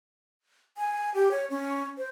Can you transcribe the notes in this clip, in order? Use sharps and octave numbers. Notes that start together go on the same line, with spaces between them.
G#5
G4
C#5
C#4
C5